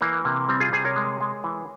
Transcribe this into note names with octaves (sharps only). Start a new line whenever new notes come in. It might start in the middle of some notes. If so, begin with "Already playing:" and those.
E3 A#3
C3 A#3
G3 C4
F4 G#4
C3 G#4 C5
A#4 C#5
G#3
G#3
E3